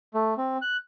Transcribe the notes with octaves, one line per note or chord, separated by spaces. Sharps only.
A3
C4
F#6